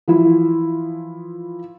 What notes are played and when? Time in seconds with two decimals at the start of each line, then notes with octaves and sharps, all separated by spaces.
0.08 E3 F3 E4